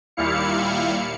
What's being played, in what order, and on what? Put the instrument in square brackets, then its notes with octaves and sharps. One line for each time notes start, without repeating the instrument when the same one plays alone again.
[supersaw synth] D#2 A#2 G3 E4 F5 C#7